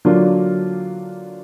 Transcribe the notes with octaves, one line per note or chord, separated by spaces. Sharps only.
D3 F#3 A#3 D4 F4